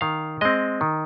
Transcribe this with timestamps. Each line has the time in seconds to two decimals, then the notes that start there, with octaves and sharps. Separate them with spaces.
0.01 D#3 F5
0.41 G#3 C4 D#5
0.81 D#3